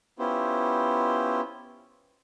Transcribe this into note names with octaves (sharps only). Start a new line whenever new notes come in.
B3 C#4 E4 F4 G4 C5